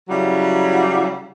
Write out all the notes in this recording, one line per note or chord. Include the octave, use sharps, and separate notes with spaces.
C#3 F#3 G3 E4